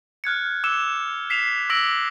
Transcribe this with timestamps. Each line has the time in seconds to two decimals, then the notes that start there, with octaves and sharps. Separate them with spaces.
0.24 F6 F#6 G#6 C#7
0.64 D6 E6 C#7 E7
1.30 B6 C7 E7 F7
1.70 D6 E6 A#6 D7 F#7